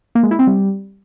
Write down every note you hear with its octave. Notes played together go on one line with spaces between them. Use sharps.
A#3
G#3
E4
C4
G3